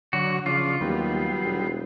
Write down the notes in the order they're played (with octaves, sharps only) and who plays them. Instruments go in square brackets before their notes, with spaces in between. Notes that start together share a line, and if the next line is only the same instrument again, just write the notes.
[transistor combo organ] D3 F#3 C#5 [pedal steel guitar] F#4
[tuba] C#3 [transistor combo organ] F3 D4 C#5 [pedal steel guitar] F4
[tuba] D#2 [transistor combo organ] F#3 G3 B3
[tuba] E1